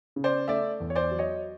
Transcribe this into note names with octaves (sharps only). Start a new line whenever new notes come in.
C#3
C5 D5
A3 D5 E5
E2
C#5
C5 D5
F#3
C#5 D#5